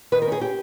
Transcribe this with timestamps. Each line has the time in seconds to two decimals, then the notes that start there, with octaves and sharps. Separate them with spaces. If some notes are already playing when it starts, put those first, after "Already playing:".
0.12 D#3 B4
0.22 A#4
0.27 C#4 G#4
0.41 G4